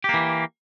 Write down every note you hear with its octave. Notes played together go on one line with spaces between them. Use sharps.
E3 A#3 G4